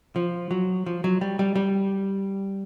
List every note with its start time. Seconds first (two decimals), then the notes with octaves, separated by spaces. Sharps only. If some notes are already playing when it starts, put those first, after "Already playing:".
0.16 F3
0.51 F#3
0.86 F3
1.04 F#3
1.21 G3
1.39 G3
1.55 G3